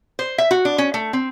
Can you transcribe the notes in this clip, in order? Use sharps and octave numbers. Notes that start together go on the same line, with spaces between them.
C5
E5
F#4
D4
C#4
A3
C4